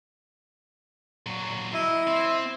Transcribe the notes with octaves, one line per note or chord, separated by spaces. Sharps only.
A#2 F#3
E4 D#5
C4